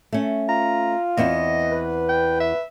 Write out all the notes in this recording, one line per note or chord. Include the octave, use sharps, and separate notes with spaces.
A3 C#4
F4 A#5
E2 B3 C4 D#5
B4
G5
E5